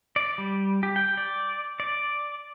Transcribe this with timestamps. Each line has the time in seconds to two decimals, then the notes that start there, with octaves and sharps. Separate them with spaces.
0.16 D5
0.38 G3
0.83 G4
0.96 G5
1.17 D5
1.80 D5